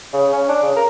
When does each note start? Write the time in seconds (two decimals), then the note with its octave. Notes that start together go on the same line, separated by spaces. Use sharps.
0.13 C#3
0.33 C#4
0.49 D4
0.62 C#3
0.76 A#4